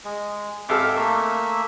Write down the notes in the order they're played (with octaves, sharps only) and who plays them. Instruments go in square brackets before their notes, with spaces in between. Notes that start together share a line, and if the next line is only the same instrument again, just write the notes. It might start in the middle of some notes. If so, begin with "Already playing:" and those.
[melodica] G#3
[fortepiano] G#1 A4 F6 [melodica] E5 F5 D6
[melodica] A3 A#3 E5